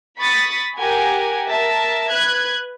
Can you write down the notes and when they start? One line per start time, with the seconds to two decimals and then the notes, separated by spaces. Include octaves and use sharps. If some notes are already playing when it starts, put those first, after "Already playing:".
0.18 B5 C#6 D#6 A6 B6
0.78 G4 A#4 F#5 G#5
1.48 A#4 E5 A5
2.10 B4 F#6 G#6